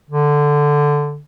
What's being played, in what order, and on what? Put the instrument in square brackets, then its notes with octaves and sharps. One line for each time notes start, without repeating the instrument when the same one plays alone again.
[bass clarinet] D3